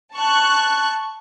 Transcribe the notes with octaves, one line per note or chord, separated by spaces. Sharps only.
A5 C#6 F#6